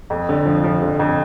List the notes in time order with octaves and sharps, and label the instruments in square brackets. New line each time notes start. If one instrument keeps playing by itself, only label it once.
[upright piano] F2
D3
F3
F3
D3
F2